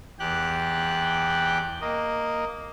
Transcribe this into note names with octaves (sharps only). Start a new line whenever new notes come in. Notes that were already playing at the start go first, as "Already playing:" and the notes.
E2 G4 G5 F#6
A#3 D#5